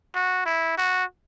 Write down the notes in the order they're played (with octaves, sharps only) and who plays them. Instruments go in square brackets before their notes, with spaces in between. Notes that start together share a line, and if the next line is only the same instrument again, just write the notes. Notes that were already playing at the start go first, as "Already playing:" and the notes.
[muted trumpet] F#4
E4
F#4